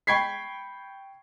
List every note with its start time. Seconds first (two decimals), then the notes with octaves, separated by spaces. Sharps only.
0.07 G5 B5 C#6 G#6 B6 C7